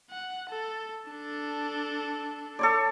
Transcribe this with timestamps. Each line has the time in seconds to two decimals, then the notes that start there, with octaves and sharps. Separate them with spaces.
0.11 F#5
0.50 A4
1.10 D4 A4
2.59 A4 C#5 D5